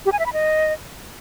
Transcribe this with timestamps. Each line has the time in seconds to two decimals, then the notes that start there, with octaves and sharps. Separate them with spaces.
0.06 G4
0.12 G#5
0.19 E5
0.26 B5
0.33 D#5